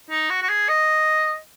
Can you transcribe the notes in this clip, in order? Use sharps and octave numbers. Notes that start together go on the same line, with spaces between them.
D#4
F#4
F#4
G#4
D#5